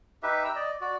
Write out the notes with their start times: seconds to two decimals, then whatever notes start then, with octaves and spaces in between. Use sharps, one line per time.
0.23 D#4 G4 B4 E5
0.44 G5 A#5 E6
0.56 D5 D#5
0.81 F#4 D5